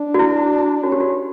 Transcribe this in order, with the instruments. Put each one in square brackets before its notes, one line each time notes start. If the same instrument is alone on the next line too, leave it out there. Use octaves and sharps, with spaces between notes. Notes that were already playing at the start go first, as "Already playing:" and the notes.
Already playing: [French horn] D4
[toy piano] F#4
E4
[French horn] C#4 [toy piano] F#4
[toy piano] G4
F#4